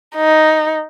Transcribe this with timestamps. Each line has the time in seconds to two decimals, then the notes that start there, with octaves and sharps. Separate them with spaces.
0.15 D#4